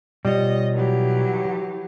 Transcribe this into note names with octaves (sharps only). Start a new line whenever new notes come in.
B2 G3 F4 C#5 D#5
E3 F#3 G4